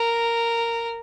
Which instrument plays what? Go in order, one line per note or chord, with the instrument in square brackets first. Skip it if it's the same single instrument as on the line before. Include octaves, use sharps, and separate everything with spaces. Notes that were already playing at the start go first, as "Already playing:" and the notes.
Already playing: [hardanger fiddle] A#4